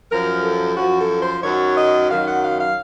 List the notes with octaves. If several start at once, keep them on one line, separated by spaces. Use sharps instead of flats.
F#2 F3 A#4
A4
F#2 F3 F#4
A4
C5
F#2 D#3 F#3 C#5
D#5
F#2 D#3 F#3 F5
F#5
F5
F5